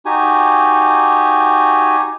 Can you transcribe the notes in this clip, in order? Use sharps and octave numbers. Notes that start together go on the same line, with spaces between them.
D#4 F#4 G4 G#5